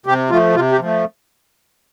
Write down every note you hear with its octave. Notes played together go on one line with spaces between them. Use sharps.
C3 G4
F3 A3 F4
C3 F4
G4
F3 A3